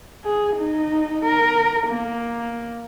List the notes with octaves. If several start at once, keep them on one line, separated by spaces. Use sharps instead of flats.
G#4
D#4
A#4
A#3